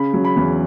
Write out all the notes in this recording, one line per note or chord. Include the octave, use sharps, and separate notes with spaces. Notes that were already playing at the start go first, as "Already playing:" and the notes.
Already playing: C#3 B5
F#3
B5
E2